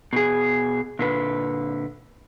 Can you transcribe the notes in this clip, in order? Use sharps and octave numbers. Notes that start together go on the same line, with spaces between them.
B2 G#4
A#2 D3 B4